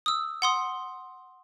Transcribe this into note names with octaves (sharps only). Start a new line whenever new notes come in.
D#6 E6
F#5 C6 D#6